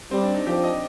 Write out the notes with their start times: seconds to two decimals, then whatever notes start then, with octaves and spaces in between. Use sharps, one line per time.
0.11 G3 C4
0.23 D4
0.34 D#4
0.47 F3 G4
0.64 D#5